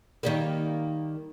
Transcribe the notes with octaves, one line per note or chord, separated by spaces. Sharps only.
D#3 G3 A#3